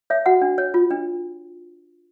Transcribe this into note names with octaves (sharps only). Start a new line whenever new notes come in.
C#5 E5
F#4 F#5
D4
C#5
F4
D4